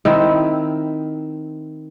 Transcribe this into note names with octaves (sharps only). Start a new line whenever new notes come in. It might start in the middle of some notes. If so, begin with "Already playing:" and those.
D#3 C4 E4